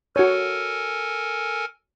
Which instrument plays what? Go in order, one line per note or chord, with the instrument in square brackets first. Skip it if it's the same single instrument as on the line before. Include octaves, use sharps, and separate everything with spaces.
[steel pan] F#4 C#5 [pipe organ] A4 A#4 G#5